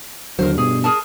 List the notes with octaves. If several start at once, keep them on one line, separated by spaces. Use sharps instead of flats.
D#2 D3 F#3 A#4 C5
G2 B2 G#4
G#4 A#4 A5